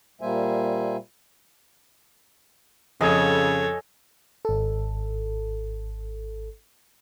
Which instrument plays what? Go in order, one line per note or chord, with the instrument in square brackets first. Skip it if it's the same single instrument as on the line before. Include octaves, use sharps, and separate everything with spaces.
[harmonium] A#2 G3 A#3 C5 E5 G#5
[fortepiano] F2 [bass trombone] C#3 [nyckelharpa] A4 C#5 [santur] D#5 G#5
[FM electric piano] G#1 A4